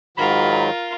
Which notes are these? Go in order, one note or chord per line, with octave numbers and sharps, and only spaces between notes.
G#2 D#3 F#3 F4 A#4 B5